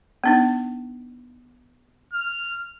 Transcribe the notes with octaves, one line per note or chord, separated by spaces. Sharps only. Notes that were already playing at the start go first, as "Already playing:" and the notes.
B3 D4 D#4
F6